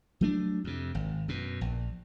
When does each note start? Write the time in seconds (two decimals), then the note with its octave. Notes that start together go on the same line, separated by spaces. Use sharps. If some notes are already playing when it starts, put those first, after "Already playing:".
0.21 F#3 A3 D4
0.64 F2 C3
0.95 G#1
1.28 F#2 B2
1.61 A#1